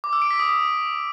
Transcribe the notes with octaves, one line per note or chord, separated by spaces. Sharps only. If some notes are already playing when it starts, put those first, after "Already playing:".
D6
E6
D7
B6
D#6